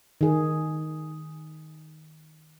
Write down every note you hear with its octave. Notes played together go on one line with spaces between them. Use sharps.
D#3 G#4